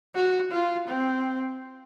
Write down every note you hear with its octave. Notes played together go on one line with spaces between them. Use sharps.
F#4
F4
C4